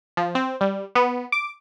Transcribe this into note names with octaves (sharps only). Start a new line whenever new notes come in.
F3
C4
G3
B3
D6